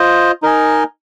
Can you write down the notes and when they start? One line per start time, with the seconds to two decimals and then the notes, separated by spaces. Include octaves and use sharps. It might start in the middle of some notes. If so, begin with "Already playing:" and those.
Already playing: F4 C5 D#5
0.42 D#4 A#4 D#5 G#5